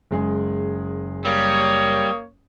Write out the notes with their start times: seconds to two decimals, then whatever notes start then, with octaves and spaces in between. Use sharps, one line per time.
0.11 F#1 G#3 G#4
1.25 G3 A#3 C#5 D#6